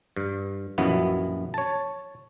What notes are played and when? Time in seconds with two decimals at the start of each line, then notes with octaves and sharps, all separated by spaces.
0.17 G2
0.78 A#1 F#2 B2 E3 B3
1.54 C#5 A5